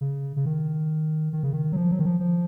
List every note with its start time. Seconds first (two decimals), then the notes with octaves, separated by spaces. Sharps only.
0.01 C#3
0.36 C#3
0.46 D#3
1.33 D#3
1.43 C#3
1.53 D#3
1.72 F#3
1.76 F3
1.91 F#3
1.99 D#3
2.06 F3
2.20 F3